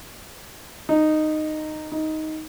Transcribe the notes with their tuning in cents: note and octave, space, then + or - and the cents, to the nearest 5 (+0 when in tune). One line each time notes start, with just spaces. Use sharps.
D#4 -10
D#4 +10